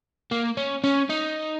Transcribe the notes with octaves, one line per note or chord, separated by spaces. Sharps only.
A#3
C#4
C#4
D#4